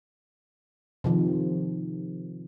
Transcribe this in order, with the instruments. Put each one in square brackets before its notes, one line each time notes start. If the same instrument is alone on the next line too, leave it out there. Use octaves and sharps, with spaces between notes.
[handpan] C3 D#3 F3